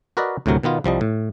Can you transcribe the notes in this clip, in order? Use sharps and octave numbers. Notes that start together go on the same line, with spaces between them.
F#4 A#4 B4 D5 D#5
D2 A2 C3 F#3 A#4
B2 D#3 B3 F4
C2 F3 G3 D#5
A2